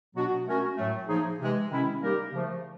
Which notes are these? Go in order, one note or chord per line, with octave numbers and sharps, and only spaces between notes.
B2 F#3 B3 D4 F#4
A3 C#4 F#4 A#4
A2 F#3 A3
F3 A#3 D#4 G#4
C3 E3 G#3
C3 D#3 G#3 C#4 E4
G3 A#3 D#4 G4 A#4
C#3 F3 A3